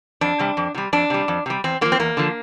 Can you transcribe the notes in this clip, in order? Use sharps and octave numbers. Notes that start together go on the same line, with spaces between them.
F2 D4
C3 G3
F2
C3 G3
F2 D4
C3 G3
F2
C3 G3
E2 C4
D3 F3 A#3
C4
E2 A#3
D3 F3